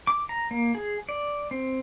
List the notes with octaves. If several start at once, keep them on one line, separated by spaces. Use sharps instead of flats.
D6
A#5
A#3
G#4
D5
C4